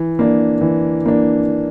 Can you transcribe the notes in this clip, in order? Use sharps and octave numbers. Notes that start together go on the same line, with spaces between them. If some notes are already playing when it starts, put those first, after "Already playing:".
Already playing: E3
A#3 D4
E3
A#3 D4